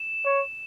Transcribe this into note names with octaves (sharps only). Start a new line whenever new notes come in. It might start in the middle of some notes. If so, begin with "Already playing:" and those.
Already playing: E7
C#5